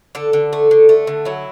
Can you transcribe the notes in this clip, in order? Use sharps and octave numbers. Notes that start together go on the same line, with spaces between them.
D3 A4
D3
A3
D3
A3
D3
F#3 E4